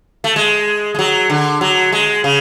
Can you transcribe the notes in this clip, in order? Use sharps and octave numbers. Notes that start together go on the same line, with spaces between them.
A3
G#3
G#3
F#3
D3
F#3
G#3
C#3